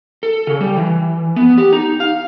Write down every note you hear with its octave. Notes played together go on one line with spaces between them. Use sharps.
A4
C#3
G3
E3
B3
G4
D#4
F5